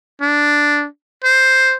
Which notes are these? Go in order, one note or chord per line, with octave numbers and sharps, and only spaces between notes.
D4
C5